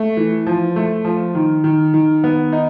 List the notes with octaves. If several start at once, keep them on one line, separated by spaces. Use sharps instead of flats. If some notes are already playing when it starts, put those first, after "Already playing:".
Already playing: A3
E3
F3
A3
F3
D#3
D#3
D#3
B3
D#4